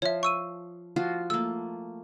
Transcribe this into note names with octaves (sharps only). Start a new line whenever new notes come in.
F3 C#5 E5
C#6 E6 D#7
F3 F4 F#4
A3 A#3 E6